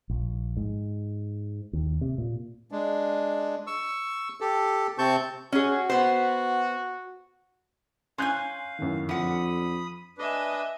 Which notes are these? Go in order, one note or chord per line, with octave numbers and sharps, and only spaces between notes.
A#1
G#2
D#2
C3
A#2
G#3 D4
C#6 E6
G4 A4
C3 C4 A5 C#6 G6
C#4 F#4 G#4
B3 C5
C#4 F5 G#5 C6 F#6 G6
F#2 A2 D#3
F2 D3 F3 F#5 B5 D#6
D4 B4 D#5 E5 G#5